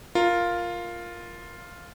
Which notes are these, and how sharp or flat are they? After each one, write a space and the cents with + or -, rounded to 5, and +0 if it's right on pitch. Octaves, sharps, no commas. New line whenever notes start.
F4 +0 A#4 +0